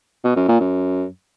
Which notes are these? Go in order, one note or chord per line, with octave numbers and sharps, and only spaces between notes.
B2
F#2
A#2
F#2